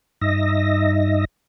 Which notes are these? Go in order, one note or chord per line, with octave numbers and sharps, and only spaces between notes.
G2 D#4 D#5 E5 A#6